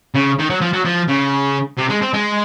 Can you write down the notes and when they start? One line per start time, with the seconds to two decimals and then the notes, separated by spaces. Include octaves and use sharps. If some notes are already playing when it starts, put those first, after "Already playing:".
0.15 C#3
0.39 D#3
0.50 F#3
0.61 F3
0.73 F#3
0.85 F3
1.08 C#3
1.78 C3
1.90 G#3
2.02 C4
2.13 G#3